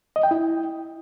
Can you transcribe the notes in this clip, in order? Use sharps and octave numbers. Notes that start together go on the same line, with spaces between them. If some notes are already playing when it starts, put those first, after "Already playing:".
D#5
G5
E4